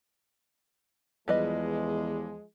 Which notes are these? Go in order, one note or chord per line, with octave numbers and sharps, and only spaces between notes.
E2 F3 G3 G#3 B4 D#5